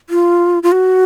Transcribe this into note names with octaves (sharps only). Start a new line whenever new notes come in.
F4
F4
F#4